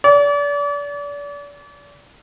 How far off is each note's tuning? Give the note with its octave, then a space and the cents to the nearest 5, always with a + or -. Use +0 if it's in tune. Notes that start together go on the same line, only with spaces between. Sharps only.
D5 -35